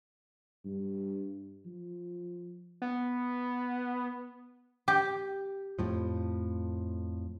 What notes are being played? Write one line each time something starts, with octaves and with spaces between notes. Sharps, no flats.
G2
F3
B3
G4
F2 A2 F3